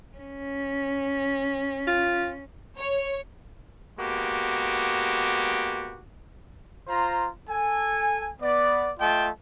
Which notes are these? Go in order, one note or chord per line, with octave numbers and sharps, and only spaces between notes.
C#4
F4
C#5
G#3 A#3 B3 F#4 G4
F4 C5 A#5
A4 G#5
B3 D5
A3 F4 D#5 G5 A5